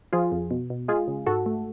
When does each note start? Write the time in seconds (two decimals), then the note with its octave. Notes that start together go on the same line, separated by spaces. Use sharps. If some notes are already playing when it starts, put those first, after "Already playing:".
0.13 F3 F4 G#4
0.32 F2
0.51 B2
0.70 B2
0.88 G#3 F4 G#4
1.08 C#3
1.26 G#2 F#4 A4
1.46 A3